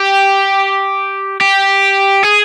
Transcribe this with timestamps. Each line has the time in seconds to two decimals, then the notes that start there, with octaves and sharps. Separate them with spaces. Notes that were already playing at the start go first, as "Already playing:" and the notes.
Already playing: G4
1.41 G4
2.23 G#4